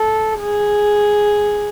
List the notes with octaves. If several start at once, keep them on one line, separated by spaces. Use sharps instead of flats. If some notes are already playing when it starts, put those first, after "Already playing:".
Already playing: A4
G#4